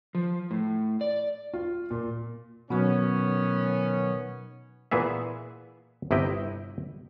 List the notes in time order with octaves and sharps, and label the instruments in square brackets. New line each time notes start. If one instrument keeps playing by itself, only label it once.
[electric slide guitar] F3
A2
D5
[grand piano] F4
A#2
[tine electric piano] B2 F#3 [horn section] D#3 B3 C#4
[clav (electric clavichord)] A#2 E3 B3 G#4 E5
G1 C3 E4 D#5 G5